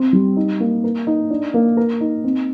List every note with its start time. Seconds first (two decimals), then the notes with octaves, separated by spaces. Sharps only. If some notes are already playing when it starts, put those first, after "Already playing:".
Already playing: C4
0.13 G3
0.37 D#4
0.60 A#3
0.84 A#4
1.07 D#4
1.30 D4
1.54 A#3
1.77 A#4
2.01 D#4
2.24 C4